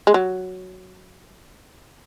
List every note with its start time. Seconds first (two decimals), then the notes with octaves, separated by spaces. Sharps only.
0.07 G#3
0.14 F#3